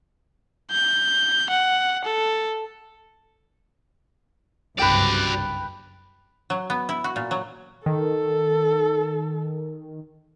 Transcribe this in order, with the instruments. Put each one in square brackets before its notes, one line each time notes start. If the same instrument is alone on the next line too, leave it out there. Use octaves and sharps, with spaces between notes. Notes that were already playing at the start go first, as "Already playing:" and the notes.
[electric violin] G6
F#5
A4
[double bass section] F#1 C2 G2 [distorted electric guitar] F#4 D5 [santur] B4 G5
[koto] F#3
B3
E4
F#4
A#2
F#3
[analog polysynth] D#3 [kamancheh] A4